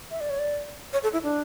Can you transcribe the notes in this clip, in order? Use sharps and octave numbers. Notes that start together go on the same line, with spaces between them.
E5
D5
C#5
D5
C#5
A4
E4
D4